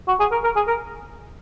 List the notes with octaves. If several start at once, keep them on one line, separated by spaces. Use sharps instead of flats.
F#4
G#4
A#4
A#4
G#4
A#4